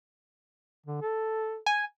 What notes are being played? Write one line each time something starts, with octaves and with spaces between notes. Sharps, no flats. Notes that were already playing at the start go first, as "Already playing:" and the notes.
D3
A4
G#5